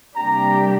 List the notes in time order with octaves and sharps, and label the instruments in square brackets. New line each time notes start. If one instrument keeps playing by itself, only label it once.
[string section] C3 G3 A#3 D4 G4 [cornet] A#5